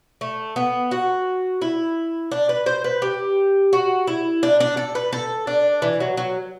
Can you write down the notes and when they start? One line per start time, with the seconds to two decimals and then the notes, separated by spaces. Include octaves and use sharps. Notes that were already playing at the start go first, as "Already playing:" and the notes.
0.21 A3
0.56 B3
0.91 F#4
1.62 E4
2.31 D4
2.49 B4
2.66 C5
2.84 B4
3.02 G4
3.73 F#4
4.07 E4
4.43 D4
4.60 D4
4.77 A4
4.95 B4
5.13 A4
5.47 D4
5.82 E3
6.00 F#3
6.17 F#3